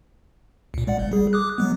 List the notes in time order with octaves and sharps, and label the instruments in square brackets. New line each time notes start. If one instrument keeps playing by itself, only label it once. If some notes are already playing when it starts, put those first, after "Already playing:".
[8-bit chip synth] C#2 A#2
G#3 D5 F#5
G1
G3 G#4
D6 D#6 F#6
F#3 G#3 B3